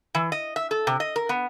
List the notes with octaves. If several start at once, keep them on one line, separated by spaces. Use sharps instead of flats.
E3
D#5
E5
A4
C3
D#5
A#4
B3